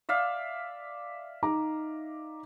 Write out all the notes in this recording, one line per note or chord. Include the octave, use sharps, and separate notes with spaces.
D5 E5 F5
D#4 A#5 D6